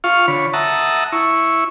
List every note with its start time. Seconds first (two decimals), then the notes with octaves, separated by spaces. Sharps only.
0.04 F4 F5 C#6
0.28 D3 C#5 B5
0.54 E5 F#5 A5 A#5 D#6
1.12 E4 C#6